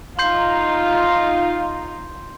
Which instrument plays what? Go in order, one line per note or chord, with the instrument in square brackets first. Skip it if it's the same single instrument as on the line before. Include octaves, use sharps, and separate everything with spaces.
[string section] D#4 F4 [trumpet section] F5 [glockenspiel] C6 G6 C7